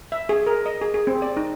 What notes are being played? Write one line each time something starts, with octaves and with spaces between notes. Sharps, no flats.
E5
G#4
A#4
D#5
G#4
G#4
C4
D5
D#4